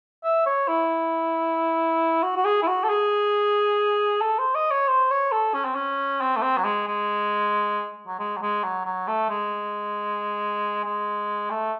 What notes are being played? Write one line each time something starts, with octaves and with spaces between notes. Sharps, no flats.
E5
C#5
E4
F#4
F#4
G#4
E4
F#4
A4
G#4
A4
C5
D#5
C#5
C5
C#5
A4
C#4
C4
C#4
C4
A3
C4
F#3
G#3
G#3
F#3
G#3
F#3
G#3
F#3
F#3
A3
G#3
G#3
A3